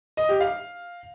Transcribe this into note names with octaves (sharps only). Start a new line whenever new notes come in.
D#5
G4
F5